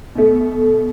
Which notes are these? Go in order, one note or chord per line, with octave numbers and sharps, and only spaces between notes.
B2 A3